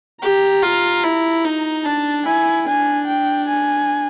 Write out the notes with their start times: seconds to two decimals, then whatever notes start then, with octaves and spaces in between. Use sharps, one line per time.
0.22 G4 A#5
0.63 F4
1.04 E4
1.45 D#4
1.85 D4 A5
2.26 E4 G#5
2.67 D4 G#5
3.08 G5
3.49 G#5